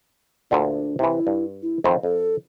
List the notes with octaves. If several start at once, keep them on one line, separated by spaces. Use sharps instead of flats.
D2 A#2 D3 D4
C3 E3 E4
G2
E4
F2 D#3 C4 C5
F2 A4